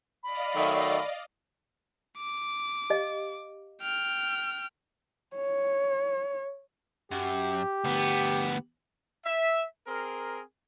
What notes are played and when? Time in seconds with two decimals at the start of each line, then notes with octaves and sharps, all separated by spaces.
0.23 D5 D#5 F5 B5
0.55 D#3 F#3 A3
2.18 D6
2.90 G4 D#5 F5
3.82 G5 F6
5.36 C#5
7.12 F#2 G4
7.84 D2 B3
9.24 E5
9.87 C4 G#4 A#4